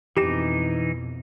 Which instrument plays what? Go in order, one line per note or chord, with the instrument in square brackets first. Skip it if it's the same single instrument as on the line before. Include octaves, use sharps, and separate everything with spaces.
[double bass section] F2 B2 [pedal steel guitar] E3 D#4 D6 [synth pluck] G4 E7